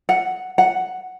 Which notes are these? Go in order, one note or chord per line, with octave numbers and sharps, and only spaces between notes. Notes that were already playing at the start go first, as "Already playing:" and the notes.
F#5
F#5